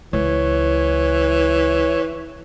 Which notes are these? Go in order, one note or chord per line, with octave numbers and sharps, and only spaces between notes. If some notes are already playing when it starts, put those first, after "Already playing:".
C#2 E3 C#5